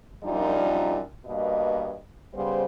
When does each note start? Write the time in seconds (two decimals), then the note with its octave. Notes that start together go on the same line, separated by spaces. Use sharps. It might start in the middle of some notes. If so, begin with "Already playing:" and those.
0.24 F#2 A#2 F3 G3 D4 D#4
1.26 G2 B2 A#3 D#5
2.34 C#3 G3 B3 C5